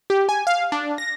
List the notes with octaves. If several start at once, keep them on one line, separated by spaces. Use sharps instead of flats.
G4
G#5
F5
D4
A#6